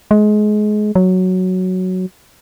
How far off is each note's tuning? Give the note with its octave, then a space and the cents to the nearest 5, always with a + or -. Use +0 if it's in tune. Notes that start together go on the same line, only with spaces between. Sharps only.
G#3 +25
F#3 +0